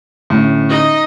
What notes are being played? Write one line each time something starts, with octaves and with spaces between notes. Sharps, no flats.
A2 D3 A3 C#4
D#4 D#5